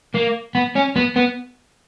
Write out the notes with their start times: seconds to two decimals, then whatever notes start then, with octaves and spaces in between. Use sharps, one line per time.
0.15 A#3
0.55 B3
0.75 C#4
0.96 B3
1.16 B3